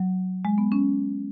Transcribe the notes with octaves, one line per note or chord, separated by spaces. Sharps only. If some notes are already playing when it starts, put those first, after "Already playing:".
Already playing: F#3
G#3
B3
C#4